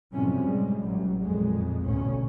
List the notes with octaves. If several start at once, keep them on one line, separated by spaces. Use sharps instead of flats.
F#2 A2 C3 F3 G3 C#4
G3 G#3
A1 F#3 G3
F2 A#2 G#3
A1 D2 B2 C#4